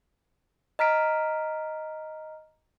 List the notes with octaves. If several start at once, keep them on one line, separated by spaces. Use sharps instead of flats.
D#5 A#5 F6 B6 D7